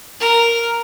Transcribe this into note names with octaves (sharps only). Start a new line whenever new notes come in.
A#4